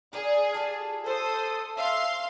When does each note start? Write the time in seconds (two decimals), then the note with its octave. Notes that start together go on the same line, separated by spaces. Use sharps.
0.13 G#4 A#4 D5
0.54 F4 G4 A4 A5
1.06 A4 C5 A5 D#6
1.77 E5 F5 C6